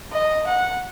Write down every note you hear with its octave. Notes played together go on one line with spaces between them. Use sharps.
D#5
F#5